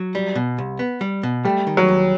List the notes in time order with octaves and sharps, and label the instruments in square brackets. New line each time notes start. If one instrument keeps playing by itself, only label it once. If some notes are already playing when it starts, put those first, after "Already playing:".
Already playing: [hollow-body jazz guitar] F#3
G3
B2
C2
B3
G3
B2
[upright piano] G3 [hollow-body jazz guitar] A3
[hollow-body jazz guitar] D#3
[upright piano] F#3
[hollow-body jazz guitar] D#2